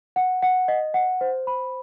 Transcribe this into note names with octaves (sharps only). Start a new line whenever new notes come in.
F#5
F#5
D#5
F#5
C5
B5